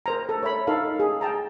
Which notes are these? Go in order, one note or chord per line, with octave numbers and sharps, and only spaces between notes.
A#4 C5 A#5
A4
C#5 E5 B5
D#4 A4 A#4 F5
G#4
G5 A5 A#5